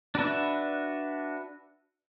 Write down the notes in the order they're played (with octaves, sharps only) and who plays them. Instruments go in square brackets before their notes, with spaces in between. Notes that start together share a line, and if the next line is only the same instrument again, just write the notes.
[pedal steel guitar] D4 F#4 B4 E5